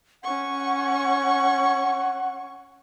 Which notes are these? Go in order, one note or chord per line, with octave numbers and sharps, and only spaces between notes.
C#4 F#5 C#6